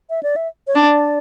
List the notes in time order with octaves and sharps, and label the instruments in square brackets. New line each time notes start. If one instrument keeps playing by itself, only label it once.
[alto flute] E5
D5
E5
C#5
[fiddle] D4 [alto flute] D5